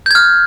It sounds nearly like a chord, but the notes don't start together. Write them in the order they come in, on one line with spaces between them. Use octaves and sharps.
G6 G#6 F6